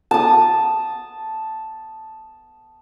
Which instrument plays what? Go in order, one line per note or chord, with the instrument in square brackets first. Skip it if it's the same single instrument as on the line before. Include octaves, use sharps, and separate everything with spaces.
[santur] A5 D#6